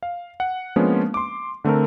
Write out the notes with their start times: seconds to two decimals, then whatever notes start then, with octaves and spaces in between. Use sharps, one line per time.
0.03 F5
0.40 F#5
0.76 F3 G#3 A#3 B3 C#4 D4
1.14 C6 D6
1.64 D3 A3 C4 A4 A#4